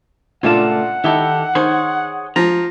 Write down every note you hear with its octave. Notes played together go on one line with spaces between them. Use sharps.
C#2 A#2 A3 D4 F4 F#5 A5
D#3 D#4 E4 G4 A4
D#3 G#4 C5 C#5 C6
F3 A#5